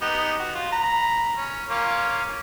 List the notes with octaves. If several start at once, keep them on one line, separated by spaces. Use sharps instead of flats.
B3 D#4 G4
F#4
F4
A#5 B5
C#4
A#3 C#4 F4